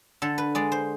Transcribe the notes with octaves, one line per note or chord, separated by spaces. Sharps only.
D3 A4
B4
G#3 D5
C5